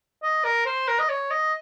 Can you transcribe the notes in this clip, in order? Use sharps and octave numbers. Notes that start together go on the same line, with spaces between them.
D#5
A#4
C5
A#4
D#5
C#5
D#5